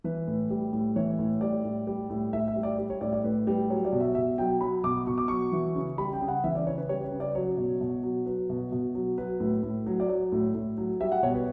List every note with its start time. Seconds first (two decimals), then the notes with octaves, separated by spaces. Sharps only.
0.04 E3 B4
0.27 A2
0.50 G3
0.73 A2
0.96 E3 C#5
1.19 A2
1.41 G3 D5
1.65 A2
1.87 G3
2.10 A2
2.33 A2 E5
2.48 E5
2.56 G3
2.63 D5
2.78 G3
2.90 C#5
3.01 A2 D5
3.13 D5
3.24 A2 B4
3.47 G3
3.70 F#3 C#5
3.85 D5
3.93 B2
4.00 E5
4.15 B2 E5
4.38 F#3 G5
4.61 F#3 B5
4.84 B2 D6
5.07 B2 C#6
5.18 D6
5.28 F#3 C#6
5.52 E3
5.75 C#3
5.98 G3 B5
6.13 G5
6.21 C#3
6.28 F#5
6.44 E3 E5
6.55 D5
6.66 C#3 C#5
6.78 B4
6.89 G3 C#5
7.05 B4
7.12 C#3
7.20 D5
7.35 F#3 C#5
7.58 B2
7.81 B2
8.03 F#3
8.26 F#3 B4
8.50 B2
8.72 B2
8.95 F#3
9.18 F#3 B4
9.40 A2
9.63 A2
9.86 F#3
10.00 D5
10.09 F#3 C#5
10.32 A2
10.55 A2
10.78 F#3
11.01 G3 E5
11.12 F#5
11.23 B2 C#5
11.35 B4